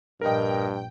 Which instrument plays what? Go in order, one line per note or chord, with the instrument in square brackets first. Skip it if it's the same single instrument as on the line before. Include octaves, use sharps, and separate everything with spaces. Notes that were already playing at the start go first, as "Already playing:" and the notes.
[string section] A#1 G5 [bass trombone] G2 [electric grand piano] A#4 D#5